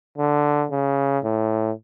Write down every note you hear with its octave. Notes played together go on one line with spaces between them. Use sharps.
D3
C#3
A2